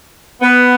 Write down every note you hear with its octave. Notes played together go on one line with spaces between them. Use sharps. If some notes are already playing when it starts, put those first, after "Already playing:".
B3